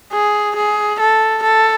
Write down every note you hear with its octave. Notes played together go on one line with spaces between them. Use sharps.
G#4
G#4
A4
A4